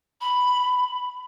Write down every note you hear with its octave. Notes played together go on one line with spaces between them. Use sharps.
B5